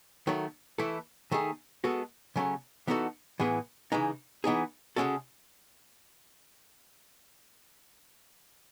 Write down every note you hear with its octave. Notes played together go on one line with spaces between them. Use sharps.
D#3 F#3 A3
E3 A3 E4 A4
D#3 A3 D#4 G#4
G#3 B3 F#4 A4
C#3 F#3 A3 C#4
E3 B3 D#4 F#4 A4
A2 E3 B3 E4 G#4
C#3 E3 G#3 D#4
E3 B3 D#4 G#4
C#3 G#3 C#4 F#4 A4